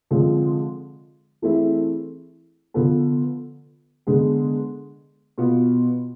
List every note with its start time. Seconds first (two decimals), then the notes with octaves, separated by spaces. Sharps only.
0.11 D3 F3 G#3 C4
1.42 E3 A3 C4 E4 G#4
2.74 D3 F3 B3 F4 A4
4.07 D3 G#3 B3 D4 G#4
5.38 B2 B3 F4